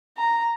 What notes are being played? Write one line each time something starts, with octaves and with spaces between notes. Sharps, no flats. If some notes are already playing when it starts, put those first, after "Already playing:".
A#5